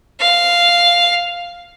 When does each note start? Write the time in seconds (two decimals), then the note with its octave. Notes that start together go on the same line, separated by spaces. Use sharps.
0.20 F5